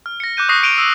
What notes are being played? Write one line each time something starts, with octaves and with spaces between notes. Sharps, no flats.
F6
A#6 C#7
D6 F#6 G6 D#7
C#6 D#6 F#6 A#6 C7
C#6 D7 D#7 F7 G7
E6